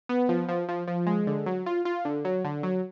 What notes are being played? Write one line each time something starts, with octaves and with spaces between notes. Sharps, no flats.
B3
F3
F3
F3
F3
G#3
D3
F#3
F4
F4
D3
F#3
D3
F#3